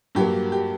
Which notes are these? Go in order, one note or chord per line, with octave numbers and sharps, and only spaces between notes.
G2 F#3 A#3 G4
G4